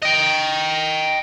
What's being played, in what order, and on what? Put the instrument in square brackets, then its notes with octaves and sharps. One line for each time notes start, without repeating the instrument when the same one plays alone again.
[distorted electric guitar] D#5 G5